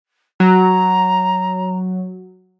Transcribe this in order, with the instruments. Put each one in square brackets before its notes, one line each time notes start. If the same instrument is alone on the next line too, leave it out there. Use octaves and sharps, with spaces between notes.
[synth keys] F#3 [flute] A#5